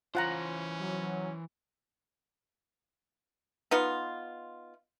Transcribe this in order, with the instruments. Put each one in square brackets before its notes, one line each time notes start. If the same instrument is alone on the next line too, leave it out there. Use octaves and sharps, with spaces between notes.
[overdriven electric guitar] E3 C5 [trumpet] C#4 [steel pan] F4 F#5 A#5
[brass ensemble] F#3
[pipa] B3 D#4 F4